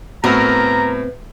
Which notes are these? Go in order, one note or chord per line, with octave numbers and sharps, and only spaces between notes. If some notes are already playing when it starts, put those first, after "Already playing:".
A2 B3 C4 F#4 A#4 A#5